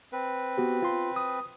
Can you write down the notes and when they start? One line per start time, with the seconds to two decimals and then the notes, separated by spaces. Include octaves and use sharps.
0.12 C4 B4
0.58 B3 F#4 G4
0.82 F4 C6
1.16 D#6